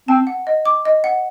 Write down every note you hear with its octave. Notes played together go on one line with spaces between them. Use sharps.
C4 A5
F#5
D#5
D6
D#5
F#5